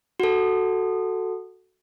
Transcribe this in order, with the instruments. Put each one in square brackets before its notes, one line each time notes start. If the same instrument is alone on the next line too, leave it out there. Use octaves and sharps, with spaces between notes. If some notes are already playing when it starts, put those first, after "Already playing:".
[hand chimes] F#4 A4